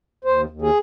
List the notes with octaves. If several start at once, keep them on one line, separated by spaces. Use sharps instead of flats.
D#2 C5
D#2
G#4